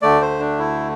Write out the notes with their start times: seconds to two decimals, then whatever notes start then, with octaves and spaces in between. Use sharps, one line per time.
0.02 D2 D3 A3 D5
0.21 C5
0.39 D4
0.59 E4